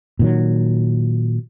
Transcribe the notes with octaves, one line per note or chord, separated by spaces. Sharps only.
A#2 D#3 F#3